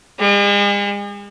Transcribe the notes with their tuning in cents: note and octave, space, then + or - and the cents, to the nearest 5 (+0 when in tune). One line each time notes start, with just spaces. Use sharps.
G#3 -45